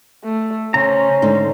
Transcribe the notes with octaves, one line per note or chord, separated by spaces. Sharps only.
A3
C#3 C#4 C5 A#5
G#2 D3